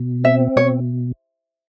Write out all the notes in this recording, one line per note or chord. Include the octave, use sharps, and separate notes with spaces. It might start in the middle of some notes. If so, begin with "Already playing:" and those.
Already playing: B2
C4 E5
B2 C#5